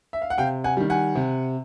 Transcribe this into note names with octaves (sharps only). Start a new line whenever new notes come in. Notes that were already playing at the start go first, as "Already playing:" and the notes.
E5
F5
F#5
C3 F5 G5
F#5 G#5
D#3 G3
F#5 G#5
C3